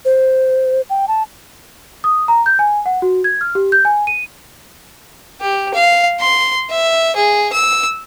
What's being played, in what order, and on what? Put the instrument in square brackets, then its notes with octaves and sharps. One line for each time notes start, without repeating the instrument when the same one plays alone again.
[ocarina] C5
G5
A5
[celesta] D#6
A#5
G6
G#5
F#5
F#4
G#6
F6
G4
G6
G#5
D#7
[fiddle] G4
F5
C6
E5
G#4
E6